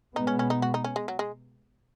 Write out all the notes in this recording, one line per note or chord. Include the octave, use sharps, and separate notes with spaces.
B2 G#3 B3 D#4
C#4
C#4
D#4
F#4
D#4
C#4
G#3
F#3
G#3